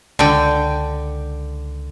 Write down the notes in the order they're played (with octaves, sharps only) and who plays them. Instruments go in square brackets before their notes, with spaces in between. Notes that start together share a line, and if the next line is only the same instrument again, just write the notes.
[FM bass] C#2 [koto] D3 G5